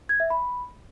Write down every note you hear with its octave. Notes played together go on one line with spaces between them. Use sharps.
G#6
E5
B5